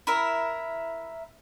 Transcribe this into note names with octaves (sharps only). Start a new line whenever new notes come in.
E4 A#4 E5